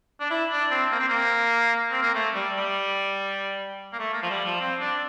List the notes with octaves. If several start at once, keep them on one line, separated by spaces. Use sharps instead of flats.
D4
E4
D4
C4
A#3
C4
A#3
C4
A#3
A3
G3
G3
A#3
A3
A#3
F3
G3
F3
C4
D4